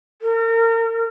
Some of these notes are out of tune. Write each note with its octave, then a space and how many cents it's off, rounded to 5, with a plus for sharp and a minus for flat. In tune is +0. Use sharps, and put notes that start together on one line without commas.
A#4 -35